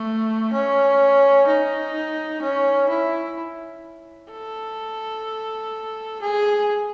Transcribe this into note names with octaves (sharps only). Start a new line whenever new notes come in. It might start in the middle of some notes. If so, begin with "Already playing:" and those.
Already playing: A3
C#4
D#4
C#4
E4
A4
G#4